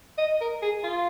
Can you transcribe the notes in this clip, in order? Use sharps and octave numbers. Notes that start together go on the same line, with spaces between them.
D#5
A#4
G#4
F4